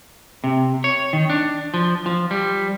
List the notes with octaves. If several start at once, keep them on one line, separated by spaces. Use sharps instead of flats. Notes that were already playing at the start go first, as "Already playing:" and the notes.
C3
C#5
D#3
D4
F3
F3
G3